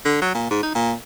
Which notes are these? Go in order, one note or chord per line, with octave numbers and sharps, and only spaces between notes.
D3
F#3
A#2
G#2
D#4
A#2